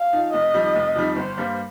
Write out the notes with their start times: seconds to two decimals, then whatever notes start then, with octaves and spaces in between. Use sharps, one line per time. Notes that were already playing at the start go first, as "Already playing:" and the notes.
Already playing: F5
0.13 F3 D#4
0.33 F1 D#5
0.54 F2 D#3 G3 D#4
0.75 F1
0.96 F2 D#3 G3 D#4
1.16 G1 C5
1.38 G2 G3 A#3